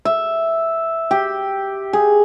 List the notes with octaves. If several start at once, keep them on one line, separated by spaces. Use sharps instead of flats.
E5
G4
G#4